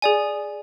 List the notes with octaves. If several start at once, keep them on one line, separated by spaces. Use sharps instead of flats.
G#4 D5 G#5